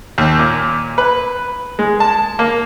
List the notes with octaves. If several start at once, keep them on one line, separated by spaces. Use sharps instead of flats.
D#2
A#2
B4
G#3
A5
A#3